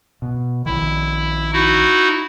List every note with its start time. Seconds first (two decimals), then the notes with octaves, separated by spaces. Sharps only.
0.22 B2
0.66 A#1 D#3 E4
1.53 D#4 E4 F#4